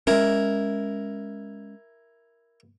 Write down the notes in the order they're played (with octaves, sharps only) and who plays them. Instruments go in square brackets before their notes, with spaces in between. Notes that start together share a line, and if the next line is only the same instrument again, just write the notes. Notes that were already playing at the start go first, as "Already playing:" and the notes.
[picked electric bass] G#3 C#4 [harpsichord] E4 A#4